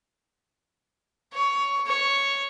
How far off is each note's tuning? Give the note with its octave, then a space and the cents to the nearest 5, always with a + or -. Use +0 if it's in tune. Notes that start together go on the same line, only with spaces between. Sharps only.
C#5 +15
C#5 +0